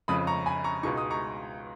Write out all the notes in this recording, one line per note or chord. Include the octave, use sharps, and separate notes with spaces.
F1 F2 C#3 B5 D#6
A#5 C#6
G#5 B5
A#5 C#6
C#2 B2 G#3 D#4 C#6
D#6
A#5 C#6